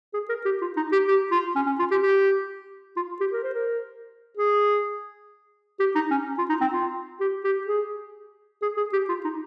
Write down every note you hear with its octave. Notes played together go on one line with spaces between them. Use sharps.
G#4
A#4
G4
F4
D#4
G4
G4
F4
C#4
C#4
F4
G4
G4
F4
G4
A#4
C5
A#4
G#4
G4
D#4
C#4
F4
D#4
C4
F4
G4
G4
G#4
G#4
G#4
G4
F4
D#4